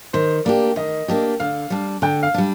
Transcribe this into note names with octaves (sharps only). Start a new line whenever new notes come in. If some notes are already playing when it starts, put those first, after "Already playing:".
D#3 C5
A#3 D4 G4 D5
D#3 D#5
A#3 D4 G4
D3 F5
G3 D4
D3 G5
F5
G3 D4